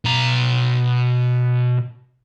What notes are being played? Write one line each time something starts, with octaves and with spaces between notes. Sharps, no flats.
B2 A#5